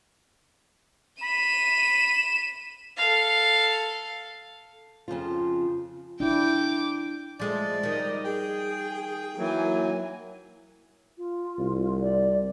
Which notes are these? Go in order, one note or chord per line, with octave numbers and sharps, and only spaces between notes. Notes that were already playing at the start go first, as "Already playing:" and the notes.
B5 D#7 E7
A4 F5
F2 C#3 F3 F4
D4 E4 G5 D6
F3 G#3 A3 D5
D#3 G3 A#4 D#5
G#4 G5
E3 F#3 A#3 G#5
F4
C2
D5